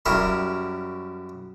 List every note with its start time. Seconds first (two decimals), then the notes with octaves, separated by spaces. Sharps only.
0.06 F#2 C#3 G3 E4 A#4 C#6